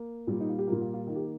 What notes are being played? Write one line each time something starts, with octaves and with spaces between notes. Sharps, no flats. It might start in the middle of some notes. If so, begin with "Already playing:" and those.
Already playing: A#3
A#2 G3 A#3
D#4
F4
G4
A#2 G3 A#3 A#4
F4
F4
D#3 A#3 F4
G4